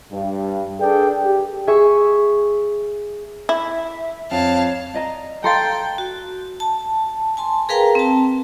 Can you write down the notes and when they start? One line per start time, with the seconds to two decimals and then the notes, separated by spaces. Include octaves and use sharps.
0.12 G2
0.79 D4 G#4 A4 B4 D5 G5
1.25 G4
1.67 G#4 E5 C#6
3.49 E4 E5
4.31 F2 C#5 F5 A5
4.94 D5 D#5 A#5
5.44 A4 F5 G5 A#5 C6 A6
5.98 F#4
6.60 A5
7.37 G#5 A5 C6
7.69 G#4 A#4 B4 F5 G5 A#5
7.95 C4 A5